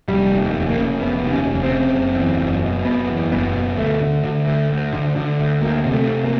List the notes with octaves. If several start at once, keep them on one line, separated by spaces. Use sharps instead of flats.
F1 G3
D#2
F1
A#3
C#3
F1 B3
D#2
C#4
F1
C4
C#3
F#1
E2
F#1
B2
F#1 B3
E2
F#1 B3
B2
D2 A3
D3
D3
D2
D2
D3
D3
D2
D2 A#3
C3
A3
C3
A#3